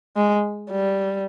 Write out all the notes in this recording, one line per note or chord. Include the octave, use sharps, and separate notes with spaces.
G#3
G3